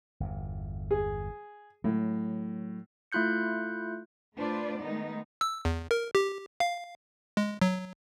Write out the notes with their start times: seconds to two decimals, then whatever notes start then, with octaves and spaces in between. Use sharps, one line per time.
0.20 G1 E2
0.91 G#4
1.84 A2 F#3
3.12 A3 E4 F4 F#6 G6 C#7
4.37 A3 D4 F4 B4 C5 D5
4.80 D#3 G#3 A3 B3 D#4
5.41 E6
5.65 E2
5.91 A#4
6.15 G4
6.60 F5
7.37 G#3
7.62 F#3